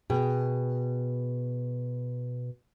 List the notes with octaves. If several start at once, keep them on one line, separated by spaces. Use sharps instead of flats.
B2 G#4 G5